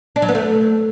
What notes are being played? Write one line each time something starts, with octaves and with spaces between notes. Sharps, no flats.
D4
F#3
B3
A3